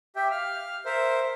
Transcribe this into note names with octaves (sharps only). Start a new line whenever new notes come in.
G4 E5 G5
F5 F6
A#4 C5 E5